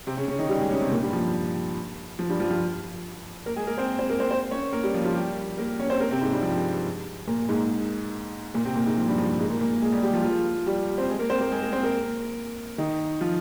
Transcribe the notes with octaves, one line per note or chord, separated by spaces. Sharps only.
C3 C4
C#3 C#4
C#3 C#4
D#3 D#4
G3 G4
G#3 G#4
C#3 C#4
C3 C4
A#2 A#3
G2 G3
F3
F3
G2 G3
F3 F4
F3 F4
A#3 A#4
G#3 G#4
A#3 A#4
C4 C5
C4 C5
A#3 A#4
C4 C5
C4 C5
C#4 C#5
A#3 A#4
G3 G4
F3 F4
F3 F4
G3 G4
A#3 A#4
C#4 C#5
C4 C5
A#3 A#4
C3 C4
G#2 G#3
G2 G3
F3
A#2 A#3
G#2 G#3
A#2 A#3
C3 C4
A#2 A#3
G#2 G#3
F3
G2 G3
F3
F3
G#2 G#3
A#2 A#3
A#2 A#3
G#3 G#4
G3 G4
G3 G4
F3 F4
F3 F4
G3 G4
C4 C5
G#3 G#4
A#3 A#4
C4 C5
A#3 A#4
G#3 G#4
A#3 A#4
C4 C5
A#3 A#4
D#3 D#4
F3 F4